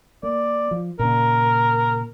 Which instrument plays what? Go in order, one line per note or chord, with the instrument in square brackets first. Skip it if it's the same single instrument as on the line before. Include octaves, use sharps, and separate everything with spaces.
[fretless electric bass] A#3 [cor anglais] D5
[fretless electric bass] F3
[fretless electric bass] A#2 C#3 [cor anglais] A#4